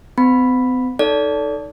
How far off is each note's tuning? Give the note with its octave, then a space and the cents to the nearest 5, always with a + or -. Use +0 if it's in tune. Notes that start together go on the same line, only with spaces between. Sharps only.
C4 -45 B5 +0
D#4 +0 A4 +0 D5 -35